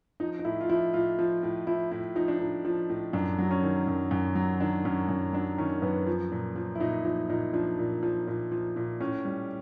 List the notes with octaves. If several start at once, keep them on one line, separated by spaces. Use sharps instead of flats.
F3 D#4
D#4
A2 E4
F4
F3 E4
A2 F4
F3
A2
F3 E4
A2 E4
F3 D#4
D4
A2 D#4
F3
A2
F#2 D4
F#3
C#4
D#3
F#2
F#2
F#3
D#3 D4
F#2 C#4
F#2
F#3 D4
D#3 C#4
F#2 B3
F3
A#2
F3
E4
A#2 D#4
F3 D#4
A#2 D#4
F3 D4
A#2
F3
A#2
F3
A#2
A2 C#4
G3